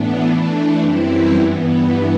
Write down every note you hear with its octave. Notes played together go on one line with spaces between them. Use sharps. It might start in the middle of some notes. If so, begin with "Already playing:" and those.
Already playing: A2 E3 B3 D4
E3 A3 D4
F#2 E3 G3 C4 E4
G2 E3 B3